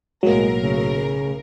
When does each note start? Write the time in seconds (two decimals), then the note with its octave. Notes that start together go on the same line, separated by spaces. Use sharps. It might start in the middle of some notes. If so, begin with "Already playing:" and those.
0.23 B1 A2 F#3 G#3 A#3 A#4
0.63 C#3